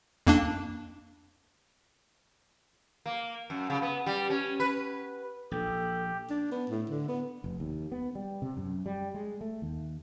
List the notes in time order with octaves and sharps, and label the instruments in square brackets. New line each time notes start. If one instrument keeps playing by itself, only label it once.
[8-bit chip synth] F2 A#3 D4
[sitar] A#3
F#2
C#3
B3
G3
C#4
B4
[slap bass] A#1 [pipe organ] G4 [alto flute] A4
[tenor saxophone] D4
B3
A2
D3
B3
[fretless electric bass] F1
D#2
B3
G3
C3
F#2
G3
G#3
A3
D#2